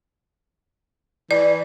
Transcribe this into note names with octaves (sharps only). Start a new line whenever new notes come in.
E3 D5